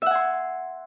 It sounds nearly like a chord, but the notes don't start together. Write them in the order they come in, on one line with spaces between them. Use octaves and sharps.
E5 F#5 G#5 C6